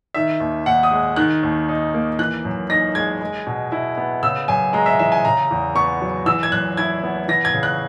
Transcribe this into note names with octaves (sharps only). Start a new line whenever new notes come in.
D#3 E5
D#2
D#2 F#5
D#6
G#3
D#3 F#6
D#2
D#4
A#3
E3 F#6
F#2
D#4 A#6
G#3 G#6
G#3
B2
E4
B3
C#3 E6
F#2 G#5
G#3 A#5
E5
E3 E5
G#5
C#3 A#5
E2
B3 C#6
F#3
E3 E6
G#6
F#2 F#6
E4 G#6
B3
E3 A#6
G#6
C#3
F#6